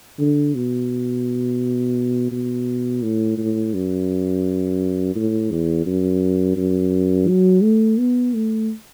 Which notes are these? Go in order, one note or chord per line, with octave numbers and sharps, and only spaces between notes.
D3
B2
B2
A2
A2
F#2
A2
E2
F#2
F#2
F#3
A3
B3
A3